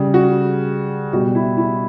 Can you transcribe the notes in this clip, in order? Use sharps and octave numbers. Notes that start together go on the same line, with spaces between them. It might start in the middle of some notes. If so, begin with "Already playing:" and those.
Already playing: C#3 G3
F#4
B2 G3 F#4
E4
E4